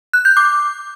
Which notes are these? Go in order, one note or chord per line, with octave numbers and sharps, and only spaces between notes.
F#6
G6
D6